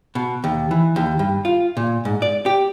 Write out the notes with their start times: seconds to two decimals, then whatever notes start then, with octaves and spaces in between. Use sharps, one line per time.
0.15 B2
0.44 D#2
0.71 E3
0.96 D#2
1.19 G2
1.45 F4
1.77 A#2
2.05 G#2
2.22 D5
2.46 G4